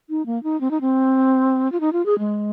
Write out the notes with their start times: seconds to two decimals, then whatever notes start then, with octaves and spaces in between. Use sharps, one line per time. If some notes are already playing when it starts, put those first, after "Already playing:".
0.10 D#4
0.26 A#3
0.43 D#4
0.61 C4
0.71 D#4
0.81 C4
1.72 F4
1.80 D#4
1.93 F4
2.06 G#4
2.19 G#3